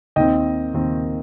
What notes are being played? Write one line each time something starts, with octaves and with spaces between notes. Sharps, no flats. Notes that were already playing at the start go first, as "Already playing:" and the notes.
D#2 D#3 C4 D#5 G5
D#2 D#3 C4